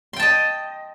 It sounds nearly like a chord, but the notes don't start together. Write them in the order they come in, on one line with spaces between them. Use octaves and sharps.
C6 G5 A5 D#5